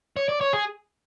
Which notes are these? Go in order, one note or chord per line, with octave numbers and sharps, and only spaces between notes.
C#5
D5
C#5
G#4